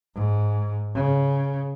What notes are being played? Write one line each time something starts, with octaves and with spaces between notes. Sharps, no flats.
G#2
C#3